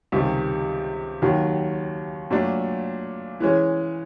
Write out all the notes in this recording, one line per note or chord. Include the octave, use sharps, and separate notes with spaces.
C#2 C3 D#3 G3
D#2 D#3 F#3
A#2 F#3 A3 D4
E3 G#3 C#4